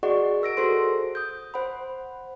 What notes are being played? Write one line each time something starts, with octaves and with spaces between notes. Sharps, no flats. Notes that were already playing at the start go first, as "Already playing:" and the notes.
F#4 G#4 D5 D#5 F#5 C#6
A#4 E6 A#6 D7
F#4 G#4 A4 C5 C6 A#6
D#6 G6
C5 F#5 B5